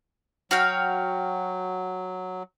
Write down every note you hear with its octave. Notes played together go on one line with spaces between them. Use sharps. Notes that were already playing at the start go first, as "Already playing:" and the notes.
F#3 F#4 F5 G5